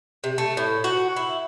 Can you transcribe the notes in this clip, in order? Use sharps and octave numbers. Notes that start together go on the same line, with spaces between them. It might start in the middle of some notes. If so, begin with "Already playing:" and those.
C3
A3
A2
F#4
E4